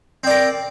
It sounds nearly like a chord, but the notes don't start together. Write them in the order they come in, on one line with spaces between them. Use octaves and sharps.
C4 D5 A#4